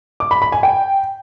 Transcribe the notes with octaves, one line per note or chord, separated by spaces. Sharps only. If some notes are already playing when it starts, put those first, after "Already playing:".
D6
B5
B5
G#5
G5